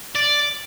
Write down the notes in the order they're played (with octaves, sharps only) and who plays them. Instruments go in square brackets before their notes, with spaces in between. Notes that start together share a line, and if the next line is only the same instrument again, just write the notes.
[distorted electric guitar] D5